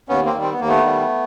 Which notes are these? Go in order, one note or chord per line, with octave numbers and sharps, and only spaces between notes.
D#2 B3 C#4
A#3 C4
D#3 G3
C4
B3
D#2 A#3
A3 B3
D#3 G3